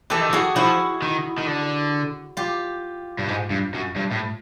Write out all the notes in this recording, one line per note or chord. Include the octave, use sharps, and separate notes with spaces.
E3 G4 A4
D#3
E3 F#4 G#4
F3 E4 F#4
D#3
D#3
D3
F4 G4
G2
G#2
G2
F#2
G2
A2